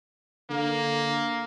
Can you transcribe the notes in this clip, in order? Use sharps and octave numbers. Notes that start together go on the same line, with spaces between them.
D3 A#3